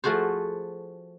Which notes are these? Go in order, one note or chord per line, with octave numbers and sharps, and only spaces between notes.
F3 A3 F#4 G#4 C5